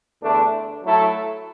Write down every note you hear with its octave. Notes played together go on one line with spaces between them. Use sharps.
E2 D3 A3 D4
F#3 A3 E4 A4